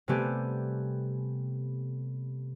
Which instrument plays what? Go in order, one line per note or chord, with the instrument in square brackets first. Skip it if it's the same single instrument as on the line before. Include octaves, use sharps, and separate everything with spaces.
[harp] C3 G3 A3 B3 G4 G#5